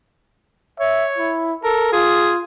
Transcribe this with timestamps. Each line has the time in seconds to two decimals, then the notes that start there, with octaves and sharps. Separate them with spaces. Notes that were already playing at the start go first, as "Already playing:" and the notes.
0.79 C#5 E5
1.18 E4
1.63 A4 A#4
1.93 F4 G#4